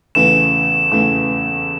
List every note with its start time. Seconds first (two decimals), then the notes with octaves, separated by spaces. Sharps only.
0.15 E2 C#3 E3 A3 E7
0.91 E2 C#3 E3 A3